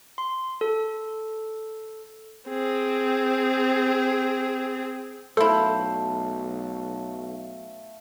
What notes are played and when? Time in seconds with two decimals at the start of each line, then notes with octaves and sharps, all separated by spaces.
0.18 C6
0.61 A4
2.49 C4 G#4
5.37 B1 A3 E4 A4 C5 F5